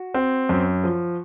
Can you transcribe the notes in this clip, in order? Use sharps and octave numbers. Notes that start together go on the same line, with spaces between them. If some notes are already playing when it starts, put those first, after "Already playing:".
Already playing: F#4
C4
F#2
F3